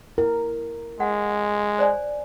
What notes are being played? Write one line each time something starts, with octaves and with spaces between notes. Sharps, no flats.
E4 A#4
G#3 F#5
C5 D5 G#5